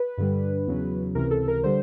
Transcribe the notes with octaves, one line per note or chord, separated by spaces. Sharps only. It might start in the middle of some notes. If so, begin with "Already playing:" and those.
Already playing: B4
G2 D3 G3
E2 C#3 F#3
C#2 C3 E3 A#4
A4
A#4
D3 G3 C5